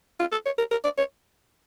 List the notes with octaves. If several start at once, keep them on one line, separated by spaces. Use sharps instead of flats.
F4
A4
C#5
A#4
A#4
D5
C#5